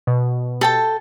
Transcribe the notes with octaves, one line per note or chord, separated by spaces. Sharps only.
B2
A4 G5 A5